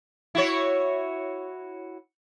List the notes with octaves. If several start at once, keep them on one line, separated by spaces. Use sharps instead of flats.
E4 F#4 C#5